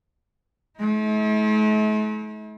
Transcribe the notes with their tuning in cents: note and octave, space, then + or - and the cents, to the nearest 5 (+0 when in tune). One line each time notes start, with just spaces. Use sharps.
A3 -45 E4 -45